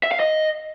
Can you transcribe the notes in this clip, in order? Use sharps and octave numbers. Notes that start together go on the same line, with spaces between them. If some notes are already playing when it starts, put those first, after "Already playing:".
E5
F5
D#5